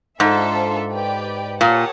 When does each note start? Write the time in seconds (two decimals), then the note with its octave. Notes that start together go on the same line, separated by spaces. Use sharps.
0.20 G#2 D4 F4 A4 C5 E5
0.90 G4 B4 D5 G5
1.60 A#2 G4 A#4 C#5 F#5 A5